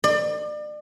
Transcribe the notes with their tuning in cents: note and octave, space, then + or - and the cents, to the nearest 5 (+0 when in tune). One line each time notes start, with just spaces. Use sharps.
D5 +35